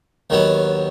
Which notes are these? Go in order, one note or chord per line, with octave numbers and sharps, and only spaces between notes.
D#2 D#3 F#3 B3